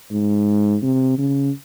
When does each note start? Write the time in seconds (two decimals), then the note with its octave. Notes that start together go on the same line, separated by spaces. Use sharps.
0.11 G#2
0.83 C3
1.19 C#3